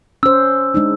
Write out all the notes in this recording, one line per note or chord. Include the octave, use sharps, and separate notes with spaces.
C#4 C5 E6
G#3 D4 D#4